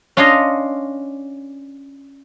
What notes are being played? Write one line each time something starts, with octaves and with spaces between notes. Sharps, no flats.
C#4 D4 F4 C#5 D#5 F5